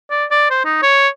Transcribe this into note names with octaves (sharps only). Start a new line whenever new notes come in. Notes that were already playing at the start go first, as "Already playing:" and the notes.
D5
D5
C5
D#4
C#5